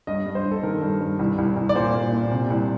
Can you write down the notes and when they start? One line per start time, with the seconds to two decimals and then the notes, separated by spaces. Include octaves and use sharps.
0.07 G2 D#5
0.26 G2
0.35 C5
0.45 G2
0.52 A4
0.63 D#3 A#4
0.81 G2
1.01 G2
1.19 C2
1.38 C2
1.57 C2
1.69 D5
1.75 A#2 C5
1.94 A#2
2.13 A#2
2.31 C3
2.50 C2